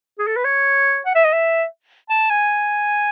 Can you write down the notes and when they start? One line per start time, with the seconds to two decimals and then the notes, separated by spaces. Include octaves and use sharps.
0.19 G#4
0.27 A4
0.36 B4
0.45 C#5
1.06 F#5
1.15 E5
1.24 D#5
1.33 E5
2.10 A5
2.30 G#5